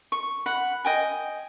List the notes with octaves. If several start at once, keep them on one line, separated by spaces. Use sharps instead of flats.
C#6
F#5 B5
D#5 G5 G#5